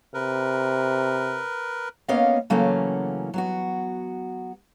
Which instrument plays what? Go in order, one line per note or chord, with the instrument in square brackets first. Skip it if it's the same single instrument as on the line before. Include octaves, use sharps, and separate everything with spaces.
[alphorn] C3 [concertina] A#4 B4
[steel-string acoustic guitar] A#3 B3 C#4 C#5 D#5 F5
C#3 E3 F#3 A3 A#3 C#4
F#3 B3 F#4